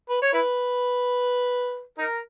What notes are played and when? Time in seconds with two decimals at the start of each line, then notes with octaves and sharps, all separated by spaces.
0.10 B4
0.22 C#5
0.33 E4 B4
1.98 D#4 A#4